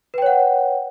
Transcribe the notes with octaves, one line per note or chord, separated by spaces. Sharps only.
B4 C#5 F#5 G5